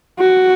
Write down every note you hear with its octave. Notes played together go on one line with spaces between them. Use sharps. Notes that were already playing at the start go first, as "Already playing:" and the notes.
F#4